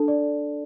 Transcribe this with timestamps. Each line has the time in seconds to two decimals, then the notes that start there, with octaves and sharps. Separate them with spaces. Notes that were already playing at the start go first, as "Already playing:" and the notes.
Already playing: D4 A4 A5
0.08 D5